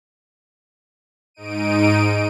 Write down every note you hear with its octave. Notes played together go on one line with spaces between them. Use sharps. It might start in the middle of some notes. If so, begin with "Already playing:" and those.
G#2 D#4 D7 D#7